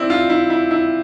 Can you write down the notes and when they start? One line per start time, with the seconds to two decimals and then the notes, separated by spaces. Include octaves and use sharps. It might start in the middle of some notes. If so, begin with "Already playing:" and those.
Already playing: C4 D4 E4
0.10 F4
0.30 E4
0.50 E4
0.71 E4